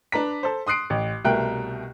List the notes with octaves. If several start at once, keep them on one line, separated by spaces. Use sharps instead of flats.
D4 B4 A#5 B6
A4 C5
C6 D#6 F#6 C7 D7
A1
C2 B2 A3 A#4 G5 F#6